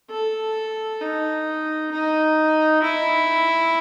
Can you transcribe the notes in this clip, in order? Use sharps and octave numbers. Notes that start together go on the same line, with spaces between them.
A4
D#4
D#4
E4